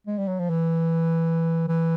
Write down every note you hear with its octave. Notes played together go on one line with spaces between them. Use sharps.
G#3
G3
F#3
F3
E3
E3